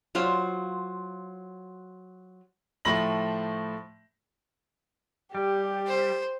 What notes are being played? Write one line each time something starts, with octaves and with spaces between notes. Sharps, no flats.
F#3 F4 C5 F5
A2 F3 A3 B5 A#6 F#7
G3 G4
C5